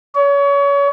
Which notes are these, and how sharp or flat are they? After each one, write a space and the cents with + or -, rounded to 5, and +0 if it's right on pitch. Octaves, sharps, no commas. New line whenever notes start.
C#5 +30